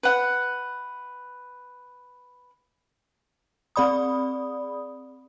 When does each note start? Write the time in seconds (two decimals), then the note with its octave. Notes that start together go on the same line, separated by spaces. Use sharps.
0.03 B4 F#5
3.76 C4 G#4 D5 B5 D#6